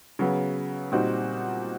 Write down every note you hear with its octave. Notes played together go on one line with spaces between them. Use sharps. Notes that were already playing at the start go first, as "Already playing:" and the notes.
C#3 F#3 B3
A#2 G3 C4 D#4 F#4